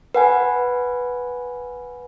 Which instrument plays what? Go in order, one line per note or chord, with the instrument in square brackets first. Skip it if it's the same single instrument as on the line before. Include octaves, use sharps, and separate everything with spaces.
[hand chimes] B4 F#5 G#5